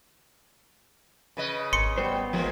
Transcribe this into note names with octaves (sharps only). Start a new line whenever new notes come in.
C#3 B4 D#5
G#1 C6 C#7
G3 B3 C5
F3 G#3 A#3